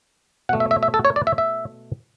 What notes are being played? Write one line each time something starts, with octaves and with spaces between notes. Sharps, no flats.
B2 A3 F#5
E5
E5
E5
A4
C#5
D5
E5
E5